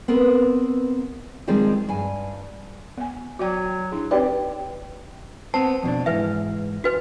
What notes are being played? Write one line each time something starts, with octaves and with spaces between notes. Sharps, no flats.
B3 C4 A#4 B4
D#3 F3 G3 G#3 C4
G2 G#5
B3 G#5
F#3 F#4 D5 G5
D4 E4 G#4
C4 D#4 G4 B4 C#5 D5 G5
B3 C4 C5 A5
F2 B2 D4
G#2 E3 B4 E5
F#4 B4